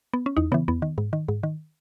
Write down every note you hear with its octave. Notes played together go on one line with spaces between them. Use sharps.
B3
C#4
E2 D#4
C#3 E3 B3
E2 B3
D#3
G#2
D#3
G#2
D#3